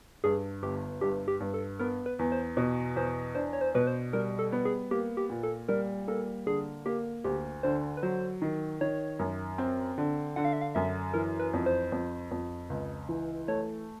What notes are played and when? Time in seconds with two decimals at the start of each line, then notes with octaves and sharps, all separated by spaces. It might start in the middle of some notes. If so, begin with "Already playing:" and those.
0.24 G2 G#4
0.63 G1 G4
1.01 G2 G4
1.28 G4
1.40 G2
1.54 A4
1.79 B3 A#4
2.06 B4
2.19 E2
2.32 C5
2.57 B2
2.96 E2 C5
3.35 D4 C5
3.53 C#5
3.61 C5
3.75 B2 B4
3.87 C5
4.13 G3 A#4
4.39 A4
4.52 B3
4.65 G#4
4.91 A#3 G4
5.17 G4
5.30 A#2
5.43 A4
5.69 G3 A#4
6.08 A#3 A4
6.46 D3 G#4
6.86 A#3 G4
7.24 D2 G4
7.63 D3 C5
7.97 B4
8.03 F#3 C5
8.42 D#3
8.81 D#3 C#5
9.19 F#2
9.58 C4
9.98 D3
10.36 D3 F#5
10.45 F5
10.53 E5
10.61 F5
10.75 F#2 E5
11.14 E3 A#4
11.40 B4
11.53 F2
11.66 C5
11.92 F2
12.31 F2
12.70 C#2
13.09 E3
13.48 A3 C#5